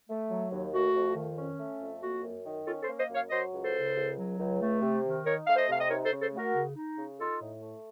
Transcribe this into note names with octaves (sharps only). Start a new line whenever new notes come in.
A3
F#3
D#2
A3 F#4
F2
D#3
C#4
A3
F2
A#3 F#4
F#2
D#3
C#4 F4 A4
A4 C5
A#3
C5 D#5
F#2
C#5 F5
F#3 C5 D#5
C#2
A4 C5
C#3
C#2
F#3
C#2
A3
C3
D#3
D#4 A#4 C#5
A3 F5
C5 D#5
C3 F5
D#5
D#4 A#4 C#5
A4 C5
C#3
A4 C5
A3
F#4 A#4
C#3
D#4
C#3
D#4 F4 A4
A2
A3